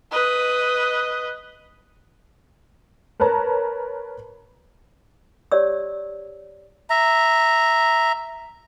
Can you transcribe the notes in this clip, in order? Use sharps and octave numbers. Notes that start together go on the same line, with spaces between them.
B4 D#5
A#4 B4 C#5 A5 A#5
G4 C#5 D5 E6
E5 A#5